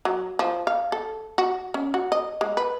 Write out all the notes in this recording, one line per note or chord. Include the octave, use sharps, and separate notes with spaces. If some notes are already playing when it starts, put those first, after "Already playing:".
F#3
F3
F5
A4
F#4
C#4
F#4
D#5
G#3
B4